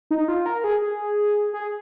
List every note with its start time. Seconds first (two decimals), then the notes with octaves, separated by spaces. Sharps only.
0.11 D#4
0.28 F4
0.46 A#4
0.64 G#4
0.82 G#4
1.54 G#4